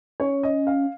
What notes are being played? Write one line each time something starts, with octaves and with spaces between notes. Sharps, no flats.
C#4 C#5
D#5
F5